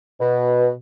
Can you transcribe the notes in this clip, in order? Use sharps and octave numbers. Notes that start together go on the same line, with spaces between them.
B2